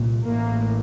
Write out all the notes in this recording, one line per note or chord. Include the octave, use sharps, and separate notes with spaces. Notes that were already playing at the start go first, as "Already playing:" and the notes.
Already playing: C2 A#2
A1 A2 A#3